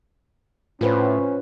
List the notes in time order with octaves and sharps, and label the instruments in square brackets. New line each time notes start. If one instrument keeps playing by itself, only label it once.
[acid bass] A2 [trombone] C#4 [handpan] F4 B4 C5